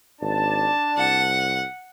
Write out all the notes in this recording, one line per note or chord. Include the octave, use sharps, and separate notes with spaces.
G#1 D4 A5
C2 F#5